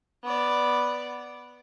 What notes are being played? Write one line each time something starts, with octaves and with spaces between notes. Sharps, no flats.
B3 D5